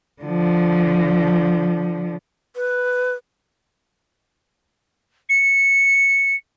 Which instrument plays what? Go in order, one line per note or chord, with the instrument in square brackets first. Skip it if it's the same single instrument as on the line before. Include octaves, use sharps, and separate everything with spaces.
[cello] D3 F3
[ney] B4
[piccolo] C#7